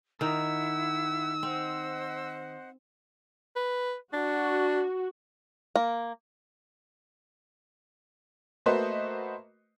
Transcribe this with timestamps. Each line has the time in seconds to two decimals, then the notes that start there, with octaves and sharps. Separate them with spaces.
0.21 D#3 D#4 E4 F#5 E6
1.43 C4 C5 D#5 F#5
3.56 B4
4.13 D4 F#4
5.76 A#3
8.66 A3 A#3 F#4 B4 C5 D#5